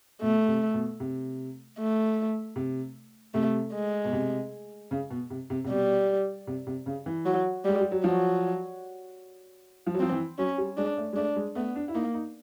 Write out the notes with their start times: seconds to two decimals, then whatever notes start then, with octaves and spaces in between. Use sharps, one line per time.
0.22 B2 A3
0.48 C3
0.74 B2
1.00 C3
1.79 A3
2.56 C3
3.34 C3 A3
3.74 G#3
4.04 B2
4.13 C3
4.91 C#3
5.10 B2
5.30 C3
5.50 C3
5.64 C3
5.69 B2 G3
6.47 C3
6.67 C3
6.86 C#3
7.06 E3
7.26 F#3
7.65 G3 G#3
7.81 G3
7.92 F#3
8.04 F3 F#3
9.87 F3
9.94 F#3
10.00 F3 C4
10.12 E3
10.38 F#3 C#4
10.58 G3
10.77 G#3 D4
10.97 A3
11.13 G#3
11.16 A3 D4
11.36 G#3
11.55 A3 B3
11.76 D4
11.88 E4
11.95 A#3 D#4
12.14 D#4